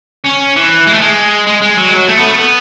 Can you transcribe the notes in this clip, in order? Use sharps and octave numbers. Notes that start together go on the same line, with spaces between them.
C#4
E3
G#3
A3
G#3
G#3
G#3
F#3
G#3
F#3
A3
B3
A3
B3